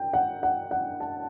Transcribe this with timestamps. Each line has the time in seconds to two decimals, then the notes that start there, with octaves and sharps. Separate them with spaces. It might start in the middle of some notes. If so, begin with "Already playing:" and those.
Already playing: G5
0.13 F#5
0.43 F#5
0.71 F#5
1.00 A5